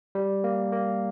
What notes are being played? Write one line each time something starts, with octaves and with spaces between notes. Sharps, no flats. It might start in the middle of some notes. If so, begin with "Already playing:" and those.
G3
A#3
A#3